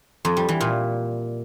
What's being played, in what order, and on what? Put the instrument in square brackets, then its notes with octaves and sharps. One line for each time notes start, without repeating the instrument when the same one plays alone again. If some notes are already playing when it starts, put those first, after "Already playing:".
[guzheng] F2
G3
E3
A#2